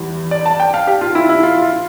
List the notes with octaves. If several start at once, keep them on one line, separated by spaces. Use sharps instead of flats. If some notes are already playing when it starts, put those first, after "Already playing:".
Already playing: E2 E3 G3
D5
A5
G5
F5
G4
F4
E4
E4
F4
F4